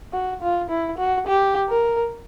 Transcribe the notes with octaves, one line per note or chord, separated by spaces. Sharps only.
F#4
F4
E4
F#4
G4
A#4